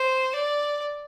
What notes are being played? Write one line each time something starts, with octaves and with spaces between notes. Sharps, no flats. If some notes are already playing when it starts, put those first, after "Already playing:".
Already playing: C5
D5